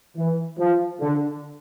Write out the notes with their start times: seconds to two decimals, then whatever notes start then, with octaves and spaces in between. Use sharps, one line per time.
0.17 E3
0.59 F3
1.01 D3